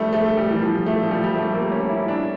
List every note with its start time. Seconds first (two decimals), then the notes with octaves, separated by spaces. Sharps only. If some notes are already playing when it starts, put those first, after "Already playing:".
Already playing: F3 G3 A3
0.13 A3
0.37 G3
0.50 E3
0.62 F3
0.86 A3
1.04 F3
1.11 G3
1.24 G3
1.35 A3
1.53 A#3
1.72 C#4
1.89 E4
2.08 D4